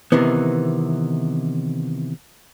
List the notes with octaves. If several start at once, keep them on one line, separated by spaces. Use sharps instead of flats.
C3 D#3 E3 B3